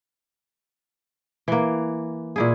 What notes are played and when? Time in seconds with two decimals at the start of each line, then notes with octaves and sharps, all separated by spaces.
1.48 E3 A#3
2.36 A#2 E4 G#4